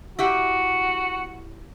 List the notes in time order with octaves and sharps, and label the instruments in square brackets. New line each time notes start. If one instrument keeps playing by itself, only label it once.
[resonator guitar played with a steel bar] E4 G4 F#5 [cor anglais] F#4